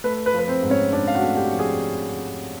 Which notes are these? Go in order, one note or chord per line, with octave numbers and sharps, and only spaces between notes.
A3 B4
B4
F3
B4
C4 C5
G#2
C#4 C#5
G#2 D4 D5
F5
F#4 F#5
A3
G4 G5
F3
G#4 G#5